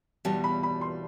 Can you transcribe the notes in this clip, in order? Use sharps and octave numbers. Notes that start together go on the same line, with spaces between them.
E2 B2 G3 A5
B5
B5
C6